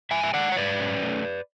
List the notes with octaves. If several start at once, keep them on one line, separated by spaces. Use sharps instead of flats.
G#2 E5 G#5
E5
G#3 D5 F#5
C#5
G#2 B4 D5
C#4
A3